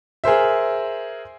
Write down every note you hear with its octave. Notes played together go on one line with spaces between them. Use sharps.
G#4 A#4 C5 E5